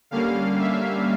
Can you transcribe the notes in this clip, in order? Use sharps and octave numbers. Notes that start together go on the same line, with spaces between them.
D3 G3 A#3 C#4 F5
E5